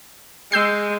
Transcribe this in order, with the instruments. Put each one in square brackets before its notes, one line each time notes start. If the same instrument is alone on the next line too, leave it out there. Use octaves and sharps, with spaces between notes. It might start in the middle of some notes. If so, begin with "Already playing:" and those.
[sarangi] G#3 [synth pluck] E6 G6 C7